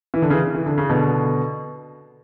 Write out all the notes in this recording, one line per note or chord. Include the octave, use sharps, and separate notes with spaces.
E3
D3
C#3 E3
E3
D3
C#3
B2 D3